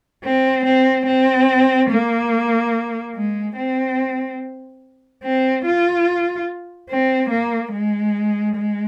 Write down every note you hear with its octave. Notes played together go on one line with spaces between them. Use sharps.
C4
C4
C4
A#3
G#3
C4
C4
F4
C4
A#3
G#3
G#3